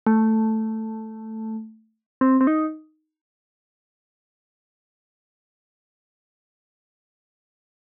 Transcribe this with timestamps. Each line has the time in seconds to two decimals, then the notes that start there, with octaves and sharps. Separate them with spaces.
0.07 A3
2.21 C4
2.41 C4
2.47 D#4